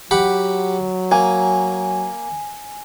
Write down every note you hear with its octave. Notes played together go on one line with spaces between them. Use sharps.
F#3 G4 F#5 B5
A#3 G#5